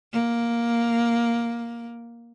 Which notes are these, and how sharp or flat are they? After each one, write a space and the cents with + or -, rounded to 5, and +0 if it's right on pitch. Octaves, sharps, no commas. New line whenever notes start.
A#3 +5